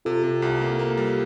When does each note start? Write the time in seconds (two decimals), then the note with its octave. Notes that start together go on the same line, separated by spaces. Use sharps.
0.05 C3 F4 A4
0.23 C3
0.42 C2
0.61 A#3
0.79 A#3
0.98 G3